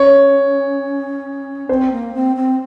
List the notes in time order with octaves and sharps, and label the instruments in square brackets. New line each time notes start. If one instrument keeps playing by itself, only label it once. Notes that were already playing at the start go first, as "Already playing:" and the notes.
Already playing: [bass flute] C#4 [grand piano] C#5
[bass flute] C4 [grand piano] C5
[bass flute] A#3
C4
C4